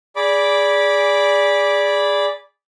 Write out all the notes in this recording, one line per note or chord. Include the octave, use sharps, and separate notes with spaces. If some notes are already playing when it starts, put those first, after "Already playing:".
G#4 D5 B5 D6